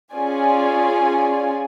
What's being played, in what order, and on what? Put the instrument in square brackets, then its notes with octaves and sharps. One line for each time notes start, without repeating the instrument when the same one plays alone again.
[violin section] C#4 F4 G#4 D5 G#5